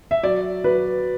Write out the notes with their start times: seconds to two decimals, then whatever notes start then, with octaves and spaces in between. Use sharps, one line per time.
0.11 E5
0.23 F#3 D5
0.64 F#3 B4